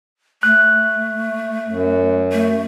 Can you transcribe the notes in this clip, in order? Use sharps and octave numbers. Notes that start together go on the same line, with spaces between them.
A3 F#6
F#2
A3